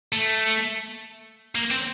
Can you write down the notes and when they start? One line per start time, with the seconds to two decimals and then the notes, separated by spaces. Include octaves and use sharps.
0.13 A3
1.55 A#3
1.71 C4